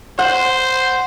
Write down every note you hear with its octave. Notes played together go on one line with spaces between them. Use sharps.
C5 F#5